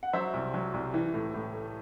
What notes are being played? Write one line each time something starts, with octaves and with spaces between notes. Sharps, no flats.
F#5
F#3 C5 E5
C2
F#3
C2
E3
A2
A2
A3